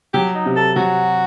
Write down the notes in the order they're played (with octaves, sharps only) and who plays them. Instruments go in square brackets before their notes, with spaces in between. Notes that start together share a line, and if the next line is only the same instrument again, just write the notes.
[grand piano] F#3 [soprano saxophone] G4
[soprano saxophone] D#4
[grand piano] C3
[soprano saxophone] A4
[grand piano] F#3 [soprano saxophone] F#4